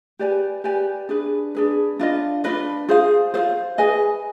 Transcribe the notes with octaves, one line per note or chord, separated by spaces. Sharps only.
G4 B4 D5 G#5
G4 B4 D5 G#5
D4 G#4 B4
D4 G#4 B4
D4 F4 B4 D#5
D4 F4 B4 D#5
F4 G#4 C5 F5
F4 G#4 C5 F5
G#4 B4 D#5 G#5